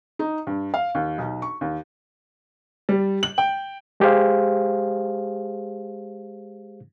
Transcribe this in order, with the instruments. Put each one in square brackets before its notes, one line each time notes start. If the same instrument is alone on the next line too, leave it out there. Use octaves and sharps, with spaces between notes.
[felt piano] D#4
G2
F5
D#2
B1
C#6
D#2
[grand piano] G3
F#7
G5
[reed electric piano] G#3 G4 G#4 C5 F5